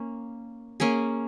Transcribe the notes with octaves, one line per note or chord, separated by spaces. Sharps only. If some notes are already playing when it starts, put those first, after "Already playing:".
Already playing: A#3 C#4
A#3 C#4 G#4